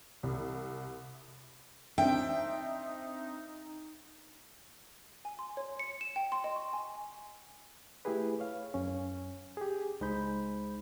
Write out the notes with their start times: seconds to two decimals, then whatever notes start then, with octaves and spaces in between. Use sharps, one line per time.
0.23 C2
1.98 C4 D4 D#4 E5 G5
5.25 G#5
5.39 C6
5.57 C#5
5.79 C#7
6.01 E7
6.16 G5
6.32 C6
6.44 D#5
6.56 C#6
6.73 G#5
8.05 A3 E4 G4 G#4 B4
8.40 C#5 F5
8.74 F#2 C#4
9.57 G4 G#4
10.01 C#2 G#3 D#4 C5 B5 G6